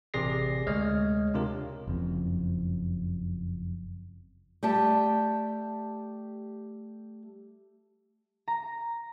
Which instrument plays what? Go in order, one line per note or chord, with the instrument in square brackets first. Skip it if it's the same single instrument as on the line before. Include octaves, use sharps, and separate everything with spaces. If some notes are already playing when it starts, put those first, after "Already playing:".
[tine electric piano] A1 C3 G#4 D5 A#6 C7
D2 G#3 C#5 D#5 F6
C3 D4 F4 A#4
[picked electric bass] F#1 F2
[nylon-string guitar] G3 A3 G4 A5
[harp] A#5